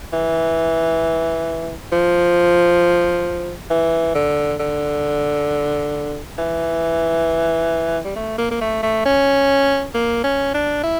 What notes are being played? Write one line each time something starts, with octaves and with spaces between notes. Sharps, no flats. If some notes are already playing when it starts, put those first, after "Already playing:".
E3
F3
E3
D3
D3
E3
G3
A3
A#3
A#3
A3
A3
C#4
A#3
C#4
D4
E4